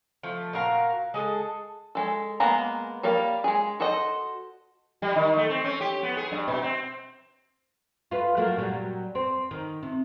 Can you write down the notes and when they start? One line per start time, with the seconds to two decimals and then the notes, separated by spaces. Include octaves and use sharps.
0.23 F3 A3
0.53 A#2 F#4 A#4 F5
1.14 G#3 G#4 A4
1.95 G#3 A4
2.40 G#3 A#3 B3 A#5
3.03 G3 A#3 D5 F5
3.44 G#3 G#4
3.80 F#4 A4 C5 D#5
5.02 G3
5.16 D#3
5.37 A3
5.50 C4
5.64 C#4
5.81 G4
6.03 B3
6.17 G#4
6.32 G2
6.48 B2
6.62 C4
8.11 F4 B4
8.37 F#3 A3 A#3
8.56 A#2 F#3 G3
9.15 C4
9.51 D#3
9.83 C3